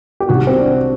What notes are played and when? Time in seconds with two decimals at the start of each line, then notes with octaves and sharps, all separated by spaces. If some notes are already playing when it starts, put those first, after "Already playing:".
0.20 G4
0.29 C2 C3 D#3 F#4
0.47 C4
0.58 D4